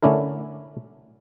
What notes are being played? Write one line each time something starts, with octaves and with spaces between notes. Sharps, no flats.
D3 A3 C#4 D4 E4 A#4